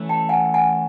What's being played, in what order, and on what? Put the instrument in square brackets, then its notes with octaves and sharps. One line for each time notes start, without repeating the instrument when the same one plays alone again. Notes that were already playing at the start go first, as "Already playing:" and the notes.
Already playing: [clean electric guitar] E3 A3 C#4
[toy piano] G5 A5
F#5 G#5
F#5 G#5